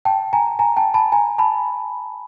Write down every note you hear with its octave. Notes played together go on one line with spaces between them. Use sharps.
G5 A5
G#5 A#5
G#5 A#5
G5 A5
A5 B5
G#5 A#5
A5 B5